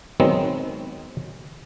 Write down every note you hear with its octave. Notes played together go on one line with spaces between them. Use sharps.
D#3 F#3 G#3 B3 C4